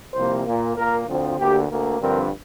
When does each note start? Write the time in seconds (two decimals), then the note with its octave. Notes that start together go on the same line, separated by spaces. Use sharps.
0.14 C2 C3 F3 A#3 C5
0.45 A#2 A#3
0.76 A#2 A#3 A#4
1.07 D2 D3 F3 C4
1.37 D2 D3 A#3 G4
1.69 D2 D3 A#3
1.99 G2 D3 F3 C4 A#4